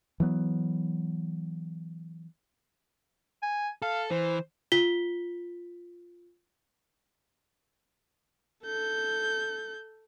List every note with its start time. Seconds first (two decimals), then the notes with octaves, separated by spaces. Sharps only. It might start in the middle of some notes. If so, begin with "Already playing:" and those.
0.20 E3 F#3 B3
3.42 G#5
3.82 A4 F5
4.10 E3 C5
4.72 F4 B6 G7
8.65 A4 G6